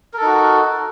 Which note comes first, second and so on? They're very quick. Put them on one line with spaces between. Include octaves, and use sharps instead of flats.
A#4 A4 D#4 F#4